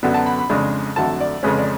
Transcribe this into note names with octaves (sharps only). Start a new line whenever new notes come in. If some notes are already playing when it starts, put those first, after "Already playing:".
F#2 D3 F#3 B3 D4
A5
B5
B5
F2 C#3 G#3 D4
F2 D3 F#3 A3 A5
D5
F2 C#3 G#3 C#4 B4
D5